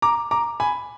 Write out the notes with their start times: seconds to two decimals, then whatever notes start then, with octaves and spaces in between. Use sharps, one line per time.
0.02 A#5 D6
0.31 A#5 D6
0.60 G#5 B5